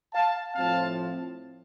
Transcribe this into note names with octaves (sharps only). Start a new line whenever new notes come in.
F5 A5
A2 F3 C4 F5 A5